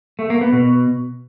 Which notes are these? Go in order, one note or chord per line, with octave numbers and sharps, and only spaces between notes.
A3
A#3
B3
B2